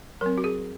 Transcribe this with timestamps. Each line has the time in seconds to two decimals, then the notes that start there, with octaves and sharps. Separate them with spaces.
0.21 F#3 C4 A#4
0.38 F#4
0.44 G#4